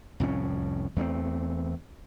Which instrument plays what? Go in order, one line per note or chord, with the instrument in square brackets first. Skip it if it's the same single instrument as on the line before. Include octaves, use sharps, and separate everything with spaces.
[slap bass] C2 F2 A2 C#4
E2 A3 A#3 C4